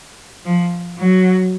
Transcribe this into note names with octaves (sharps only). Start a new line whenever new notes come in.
F3
F#3